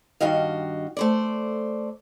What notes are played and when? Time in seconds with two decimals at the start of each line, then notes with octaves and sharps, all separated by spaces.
0.21 G2 D#3 F#4 D#5 F5
0.97 A3 C5 D5